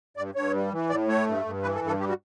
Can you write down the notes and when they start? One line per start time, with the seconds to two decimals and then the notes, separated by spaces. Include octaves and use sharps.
0.17 G2 D5
0.35 G2 C#5
0.53 G3
0.72 E3
0.89 A2 D5
1.08 A3 C#5
1.27 G2
1.45 G2
1.63 E3 B4
1.75 A4
1.81 G2
1.87 A4
2.00 G3 G4
2.09 F#4